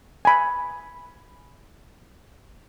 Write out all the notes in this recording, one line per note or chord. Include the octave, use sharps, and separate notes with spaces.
G#5 B5